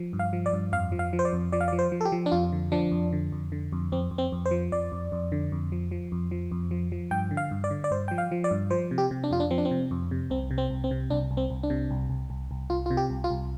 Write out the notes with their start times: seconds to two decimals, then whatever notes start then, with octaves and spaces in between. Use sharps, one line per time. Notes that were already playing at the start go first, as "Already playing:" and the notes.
Already playing: F3
0.13 G2
0.19 F5
0.33 F3
0.46 D5
0.53 G2
0.72 F2 F5
0.92 F3
0.99 F5
1.13 F3
1.19 C5
1.25 D5
1.33 F2
1.52 F3 D5
1.61 F5
1.68 D5
1.73 F3
1.79 C5
1.92 F3
2.01 A4
2.05 G4
2.12 F3
2.26 D4
2.31 F2 F4
2.52 D3
2.72 F3 D4
2.91 F2
3.13 D3
3.32 F2
3.52 D3
3.72 F2
3.92 F2 C4
4.11 F2
4.18 C4
4.32 F2
4.46 C5
4.51 F3
4.72 F2 D5
4.92 F2
5.12 F2
5.32 D3
5.52 F2
5.72 F3
5.91 F3
6.12 F2
6.31 F3
6.51 F2
6.71 F3
6.92 F3
7.11 G2 G5
7.31 D3
7.37 F5
7.51 G2
7.64 D5
7.71 D3
7.84 D5
7.91 G2 C5
8.08 F3 G5
8.18 F5
8.31 F3
8.44 D5
8.51 G2
8.70 F3 C5
8.91 C3
8.98 G4
9.11 C3
9.24 D4
9.31 F2 F4
9.40 D4
9.51 F3 C4
9.58 D4
9.65 C4
9.71 C3
9.91 F2
10.11 C3
10.30 C2 C4
10.51 C3
10.58 C4
10.70 C2
10.84 C4
10.91 C3
11.10 C2 D4
11.31 C2
11.37 C4
11.50 C2
11.63 D4
11.70 C3
11.90 C2
12.10 C2
12.30 C2
12.51 C2
12.70 C2 F4
12.86 C3 F4
12.97 G4
13.10 C2
13.24 F4
13.31 C2